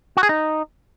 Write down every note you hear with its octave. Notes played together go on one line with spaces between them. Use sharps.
F#4
G#4
D#4